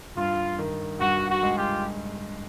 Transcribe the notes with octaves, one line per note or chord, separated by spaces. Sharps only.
G2 F4
D#3
G2 F#4
F#4
G#3
F4 G4